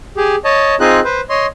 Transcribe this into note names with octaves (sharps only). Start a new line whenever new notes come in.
G4 G#4
C#5 D#5 A5
C4 D#4 F4 G#4 D#5 F#6
B4 C5
C#5 D#5 C6